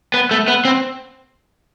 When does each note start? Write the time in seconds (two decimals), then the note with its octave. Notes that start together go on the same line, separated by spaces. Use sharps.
0.14 B3
0.31 A3
0.48 B3
0.65 C4